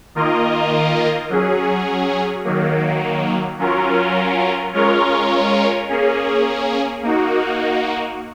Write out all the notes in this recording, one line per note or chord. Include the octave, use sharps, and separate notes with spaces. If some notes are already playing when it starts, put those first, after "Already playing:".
D#3 A#3 F4 A#4 D#5
F#3 C#4 G#4
D#3 F#3 A#3
F#3 C#4 F4 A#4
G#3 C#4 F4 A#4 C#5
A#3 C#4 G#4
A#3 D#4 F#4